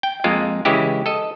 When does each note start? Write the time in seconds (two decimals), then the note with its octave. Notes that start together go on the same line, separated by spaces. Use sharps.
0.03 G5
0.24 F2 G#3 A#3 F4
0.65 C#3 E3 G#3 E4 G4
1.06 A4 D#5